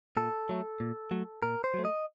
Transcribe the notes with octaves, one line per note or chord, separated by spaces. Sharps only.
A#2 A4
F#3 A3
A#2
F#3 A3
A#2 A#4
C5
F#3 A3
D#5